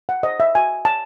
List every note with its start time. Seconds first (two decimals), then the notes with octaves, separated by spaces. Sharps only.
0.09 F#5
0.23 C5 D#5
0.40 E5
0.55 F#4 G#5
0.85 C#5 A5